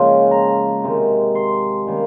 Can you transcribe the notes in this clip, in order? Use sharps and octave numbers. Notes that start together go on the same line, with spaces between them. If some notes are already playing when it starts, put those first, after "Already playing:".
Already playing: C#3 F3 G#3 A#3 C#4 G#5
A#5
C3 D#3 G#3
C6
D#3 G3 A#3 C#4